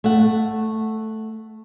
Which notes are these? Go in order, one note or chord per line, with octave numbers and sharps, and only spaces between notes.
A3 F#5